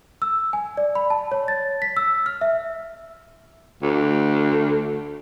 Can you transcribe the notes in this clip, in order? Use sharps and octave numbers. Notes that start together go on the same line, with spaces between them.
E6
G#5
D5
B5
A5
C#5
A6
B6
E6
F6
E5
D2